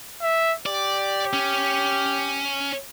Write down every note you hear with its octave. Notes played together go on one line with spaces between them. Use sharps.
E5
G4 D5
C#4